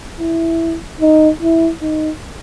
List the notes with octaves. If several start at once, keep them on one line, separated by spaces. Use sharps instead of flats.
E4
D#4
E4
D#4